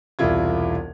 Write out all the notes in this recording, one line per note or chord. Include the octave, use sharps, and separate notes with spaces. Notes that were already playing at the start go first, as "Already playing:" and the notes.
E1 C2 E4 F4 G#6